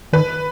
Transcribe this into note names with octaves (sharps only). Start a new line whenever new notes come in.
D#3 B4